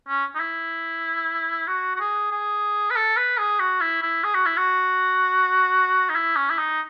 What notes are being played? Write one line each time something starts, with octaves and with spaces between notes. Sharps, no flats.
C#4
D#4
E4
F#4
F#4
G#4
G#4
B4
A4
B4
G#4
F#4
E4
E4
G#4
F#4
E4
F#4
D#4
E4
C#4
E4
D#4